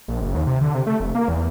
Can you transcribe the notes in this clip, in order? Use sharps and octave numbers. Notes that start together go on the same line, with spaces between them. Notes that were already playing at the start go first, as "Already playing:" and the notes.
A#1
F#1
D#2
C3
D3
C3
A3
F1
A#3
E2